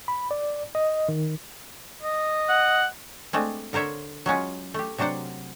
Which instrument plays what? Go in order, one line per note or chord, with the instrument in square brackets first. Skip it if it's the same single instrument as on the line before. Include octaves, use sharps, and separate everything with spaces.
[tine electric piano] B5
D5
D#5
D#3
[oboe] D#5
[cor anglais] F#5
[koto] G#3 A3 C4 D4
D3 A#4 C5 C#5 E5
F#3 G#3 C#4 F4
A3 G4
C3 F#3 D4 C5 F#5